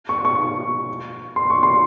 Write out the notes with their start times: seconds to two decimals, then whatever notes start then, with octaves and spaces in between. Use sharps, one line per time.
0.09 C#6
0.25 C#6
1.36 C6
1.50 C#6
1.63 C6